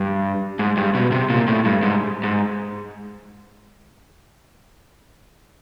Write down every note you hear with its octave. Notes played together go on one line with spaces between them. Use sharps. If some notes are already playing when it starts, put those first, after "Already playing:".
Already playing: G2
G#2
G2
B2
C3
A#2
A2
G2
G#2
G#2